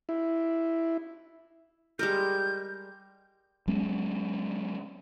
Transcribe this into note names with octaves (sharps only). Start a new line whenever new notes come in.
E4
G3 G#3 A#4 G6
F#3 G#3 B3 C#4